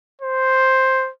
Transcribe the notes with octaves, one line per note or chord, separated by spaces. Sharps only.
C5